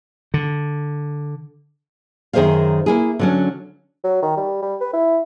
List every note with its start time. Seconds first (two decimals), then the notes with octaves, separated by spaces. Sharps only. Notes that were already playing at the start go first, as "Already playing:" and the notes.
0.34 D3
2.33 F#2 D#3 G#4 C5 E5 F5
2.86 A#3 E4 G#4
3.19 D3 F#3 C#4
4.04 F#3
4.23 D#3
4.37 G3
4.62 G3
4.81 B4
4.93 E4